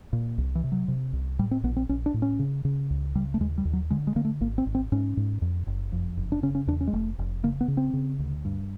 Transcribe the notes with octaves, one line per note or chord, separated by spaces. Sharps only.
A#2
C2
E3
C3
F#3
C3
C2
A2 G3
C4
A#1 B3
C4
A#1 C#4
D4
A2
C#4
C#3
C#3
C#2
C#3 G3
A3
D#2 G#3
G3
D#2
F#3
D3 G#3
G#3
D3 A#3
A3
G#1 A#3
C4
G#1
C4
G#2 C#4
G#2
F2
F#1
F2
F#1
D4
C#3 C#4
C#4
E2 D4
C#4
G#3
F1 A3
F1
C#3 A#3
B3
C#3
C4
C#3
D2
G2